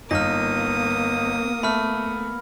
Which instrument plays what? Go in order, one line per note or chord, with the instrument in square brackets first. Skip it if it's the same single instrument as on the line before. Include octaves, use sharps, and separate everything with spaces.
[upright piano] G1 D#4 [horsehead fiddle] A#3 B3 [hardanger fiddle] D#6 [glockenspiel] F6 A#6
[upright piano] A3 [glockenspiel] B5 F6